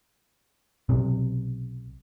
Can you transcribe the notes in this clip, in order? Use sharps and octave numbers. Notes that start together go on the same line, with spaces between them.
B1 C3